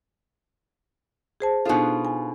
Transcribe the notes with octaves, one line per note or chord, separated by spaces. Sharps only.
G#4 C5 A5
B2 D4 D#4 F4 A4
G#5